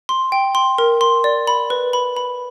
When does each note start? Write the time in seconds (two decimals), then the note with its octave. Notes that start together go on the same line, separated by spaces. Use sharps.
0.09 C6
0.32 G5
0.55 C6
0.78 A#4
1.01 C6
1.24 D5
1.47 B5
1.70 B4
1.93 B5
2.16 B5